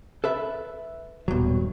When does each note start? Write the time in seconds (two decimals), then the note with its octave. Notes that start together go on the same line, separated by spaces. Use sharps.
0.24 A4 B4 E5
1.28 D#1 G2 B2 F#3